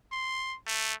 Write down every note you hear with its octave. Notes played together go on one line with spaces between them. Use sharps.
C6
A3